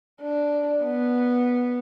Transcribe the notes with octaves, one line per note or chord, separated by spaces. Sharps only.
D4
B3